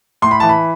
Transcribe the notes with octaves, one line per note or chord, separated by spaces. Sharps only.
A2 C6
B5
E3 A5
B5